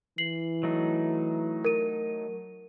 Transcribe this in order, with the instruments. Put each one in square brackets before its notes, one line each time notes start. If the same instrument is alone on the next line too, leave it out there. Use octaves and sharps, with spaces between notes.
[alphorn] E3 [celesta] C7 F#7
[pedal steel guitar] F#3 A3 D#4
[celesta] A#4 D#7